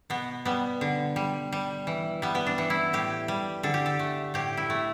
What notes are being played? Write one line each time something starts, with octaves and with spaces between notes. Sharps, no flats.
B2 B3
G3 B3
D3
G3
G3
E3
G3 B3
B3
D4
E3
E4
A2 G4
G3
D3 A4
G4
A4
A3
A2 G4
E4
A3